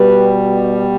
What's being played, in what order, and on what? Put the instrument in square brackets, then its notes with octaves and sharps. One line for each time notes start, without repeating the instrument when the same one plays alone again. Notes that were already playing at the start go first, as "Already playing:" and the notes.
Already playing: [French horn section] B2 G3 B4